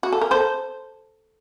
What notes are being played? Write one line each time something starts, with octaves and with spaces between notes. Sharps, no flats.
F#4
A4
A#4
A4 C5